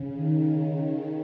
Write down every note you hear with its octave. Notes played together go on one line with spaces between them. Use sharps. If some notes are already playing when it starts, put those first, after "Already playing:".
Already playing: C#3
D#3